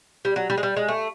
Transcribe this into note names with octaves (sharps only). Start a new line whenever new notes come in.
G3
F#3
G3
G#3
G3
G#3
A3